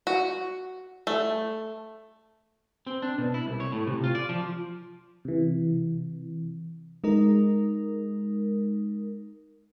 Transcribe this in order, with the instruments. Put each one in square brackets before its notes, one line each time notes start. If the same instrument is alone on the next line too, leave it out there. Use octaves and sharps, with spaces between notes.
[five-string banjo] F#4
A3
[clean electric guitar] C4
D4
B2
E4
C2
C#5
A2
C3
F4
D5
F3
[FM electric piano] C3 E3
G#3 D#4 A#4